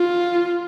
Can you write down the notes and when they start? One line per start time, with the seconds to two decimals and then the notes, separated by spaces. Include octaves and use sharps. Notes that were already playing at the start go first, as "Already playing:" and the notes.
Already playing: F4